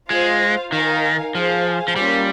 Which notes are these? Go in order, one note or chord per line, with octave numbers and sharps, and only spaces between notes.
G#3 F4 C5 F5
D#3 D#4 A#4 F5 G#5
F3 G#4 C5 F5 G#5
F3
G3 A#3 C#4 F4